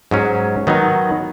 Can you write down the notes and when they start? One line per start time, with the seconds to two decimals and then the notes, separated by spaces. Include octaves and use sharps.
0.11 G#2 F#3 C#4
0.67 D#3 F#3 B3 D#4